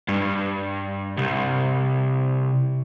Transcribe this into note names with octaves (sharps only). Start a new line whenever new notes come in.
G2
C2